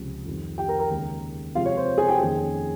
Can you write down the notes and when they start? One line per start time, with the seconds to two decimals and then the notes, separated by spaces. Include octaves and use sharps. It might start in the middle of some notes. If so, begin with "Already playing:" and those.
Already playing: C#2 C3 F3
0.25 F2 D#3 G3 C4
0.58 G4 G5
0.68 A#4 A#5
0.79 A#4 A#5
0.90 D#2 C#3 G#3
1.55 C3 F3 G#3 C4 F4 F5
1.66 C#5
1.77 C5
1.98 G#4 G#5
2.08 G4 G5
2.20 F2 D#3 A#3 C#4 G#4 G#5